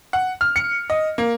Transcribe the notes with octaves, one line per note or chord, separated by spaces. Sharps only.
F#5
F6
C#7
D#5
A#3